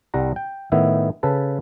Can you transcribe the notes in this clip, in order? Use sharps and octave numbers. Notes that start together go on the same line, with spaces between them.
C2 G3 F#5 A#5
G5
A2 D#3 B3 E4 E5
C#3 A4 B4 A5